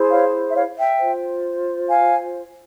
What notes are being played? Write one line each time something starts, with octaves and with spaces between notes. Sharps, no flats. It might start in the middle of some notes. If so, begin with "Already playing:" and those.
Already playing: E4 G#4 C5
C#5 F5
E5
C#5 F5
E5 G5
F4 C5
F5 G#5